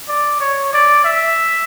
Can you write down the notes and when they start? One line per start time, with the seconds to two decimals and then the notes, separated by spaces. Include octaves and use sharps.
0.08 D5
0.40 C#5
0.73 D5
1.05 E5